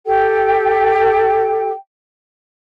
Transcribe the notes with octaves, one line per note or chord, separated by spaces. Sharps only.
G4 A4 G5